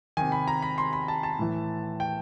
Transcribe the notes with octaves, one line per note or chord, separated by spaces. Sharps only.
C3 D#3 G#5
B5
A#5
B5
C6
B5
A5
A5
A2 E3
G5